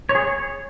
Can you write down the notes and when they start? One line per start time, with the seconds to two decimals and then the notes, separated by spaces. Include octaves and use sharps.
0.09 C#5
0.15 G#4
0.20 C#5